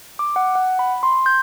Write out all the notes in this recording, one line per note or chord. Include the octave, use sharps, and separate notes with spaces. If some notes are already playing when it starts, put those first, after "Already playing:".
D6
F#5
F#5
B5
C6
G6